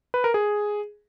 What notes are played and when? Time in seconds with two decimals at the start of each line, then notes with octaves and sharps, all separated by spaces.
0.14 B4
0.24 A#4
0.34 G#4